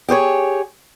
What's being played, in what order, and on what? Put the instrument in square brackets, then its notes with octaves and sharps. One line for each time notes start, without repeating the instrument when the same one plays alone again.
[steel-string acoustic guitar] G4 G#4 C5 C#5